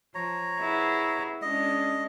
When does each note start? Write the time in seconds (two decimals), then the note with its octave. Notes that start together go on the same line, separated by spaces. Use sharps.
0.14 F3 C#5 A#5
0.59 B3 E4 G#4
1.42 G#3 C#4 D4 D#5